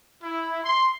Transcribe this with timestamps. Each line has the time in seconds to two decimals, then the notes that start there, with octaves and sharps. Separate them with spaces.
0.23 E4
0.65 C6